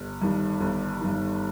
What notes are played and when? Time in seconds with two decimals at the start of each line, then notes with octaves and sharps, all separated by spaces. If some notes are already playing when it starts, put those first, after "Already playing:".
Already playing: G1
0.22 G2 D#3
0.60 G1
1.01 G2 D#3